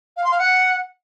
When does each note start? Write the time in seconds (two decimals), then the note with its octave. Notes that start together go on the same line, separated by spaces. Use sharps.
0.17 F5
0.24 C6
0.31 F5
0.39 F#5